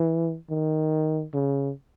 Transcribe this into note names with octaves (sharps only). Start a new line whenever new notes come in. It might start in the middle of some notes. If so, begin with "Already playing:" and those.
Already playing: E3
D#3
C#3